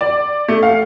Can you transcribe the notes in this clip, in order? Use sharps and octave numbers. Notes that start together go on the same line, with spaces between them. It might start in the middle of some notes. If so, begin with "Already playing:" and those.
D5
A3
F5